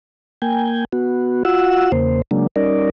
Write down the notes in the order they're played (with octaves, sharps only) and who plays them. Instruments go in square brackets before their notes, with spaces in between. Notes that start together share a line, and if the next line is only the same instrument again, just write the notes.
[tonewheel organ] A#3 G5 G#5
B3 F#4
F4 F#4 F#5 E6
E2 C#3 A#3 C5
C#3 F#3 G#3 A#3 D4
G3 C#4 D#4 A#4 D5